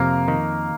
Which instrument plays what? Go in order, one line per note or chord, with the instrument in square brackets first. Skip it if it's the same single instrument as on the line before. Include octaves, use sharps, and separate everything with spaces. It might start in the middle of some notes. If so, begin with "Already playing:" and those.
Already playing: [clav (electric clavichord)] F2 C3 [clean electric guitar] A#3
[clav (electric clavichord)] D#3